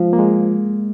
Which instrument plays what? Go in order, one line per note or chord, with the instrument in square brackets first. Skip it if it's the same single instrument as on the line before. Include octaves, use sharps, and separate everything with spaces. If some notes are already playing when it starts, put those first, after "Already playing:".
Already playing: [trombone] F3 [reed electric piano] G#3
[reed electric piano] A#3
G#3